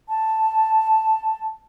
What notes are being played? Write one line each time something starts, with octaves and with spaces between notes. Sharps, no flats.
A5